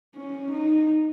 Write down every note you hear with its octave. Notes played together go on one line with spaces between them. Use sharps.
C#4
D#4